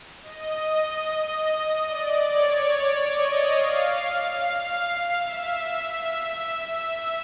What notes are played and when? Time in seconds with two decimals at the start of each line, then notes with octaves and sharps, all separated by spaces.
0.23 D#5
1.87 D5
2.29 C#5
2.70 D5
3.11 D#5
3.52 F5
5.17 E5